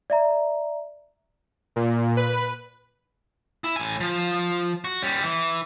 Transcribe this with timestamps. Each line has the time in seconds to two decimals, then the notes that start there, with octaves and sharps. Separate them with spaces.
0.10 D5 E5 A#5
1.76 A#2
2.17 B4
3.64 E4
3.76 A2 G#5
4.00 F3
4.84 F#4
5.02 G3 C#4
5.23 E3